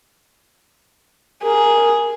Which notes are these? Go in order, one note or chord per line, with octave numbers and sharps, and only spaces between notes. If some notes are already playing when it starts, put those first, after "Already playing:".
G#4 A#4